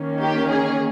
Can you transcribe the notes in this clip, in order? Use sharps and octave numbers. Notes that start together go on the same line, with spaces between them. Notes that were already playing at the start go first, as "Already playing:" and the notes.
Already playing: D#3 A#3 C#4
G4
G#4